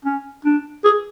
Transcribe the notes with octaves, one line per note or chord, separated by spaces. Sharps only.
C#4
D4
G#4